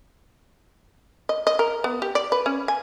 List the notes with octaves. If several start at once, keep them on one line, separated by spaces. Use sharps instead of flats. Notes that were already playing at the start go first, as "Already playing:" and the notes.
D#5
D#5
A#4
B3
G4
D5
B4
C#4
G#5